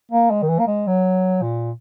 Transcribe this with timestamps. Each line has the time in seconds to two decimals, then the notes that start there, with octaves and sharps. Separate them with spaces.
0.12 A#3
0.31 G#3
0.43 D#3
0.49 E3
0.60 A#3
0.67 G#3
0.87 F#3
1.42 A#2